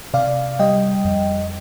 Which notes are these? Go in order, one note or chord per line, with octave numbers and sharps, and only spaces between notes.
C3 D5 F5
G3 D#5 G5
F2